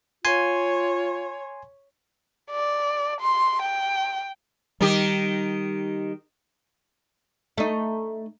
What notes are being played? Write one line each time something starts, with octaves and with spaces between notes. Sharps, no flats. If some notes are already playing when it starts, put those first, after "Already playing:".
F4 C#5 G#5 C6
D5
C6
G5
D#3 G3 D#4 G4
A3 D#4